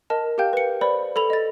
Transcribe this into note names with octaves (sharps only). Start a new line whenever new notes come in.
A#4 D#5 A5
G4 A#4 F5 G5 G6
B4 C#7
B4 C5 D5 B5
A4 B5 F7
D#5 A6